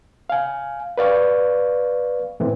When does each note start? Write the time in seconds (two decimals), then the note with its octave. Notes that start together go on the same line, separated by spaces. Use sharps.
0.30 F5 G#5
0.98 B4 D5 F5 C#6
2.40 A2 E3 C4